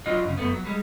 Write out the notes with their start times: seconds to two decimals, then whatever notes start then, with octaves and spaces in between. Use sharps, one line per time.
0.06 F#3 D4 F4 D#5
0.24 F#2 C#3
0.37 F#2 A3 B3
0.53 F#3
0.65 G3 G#3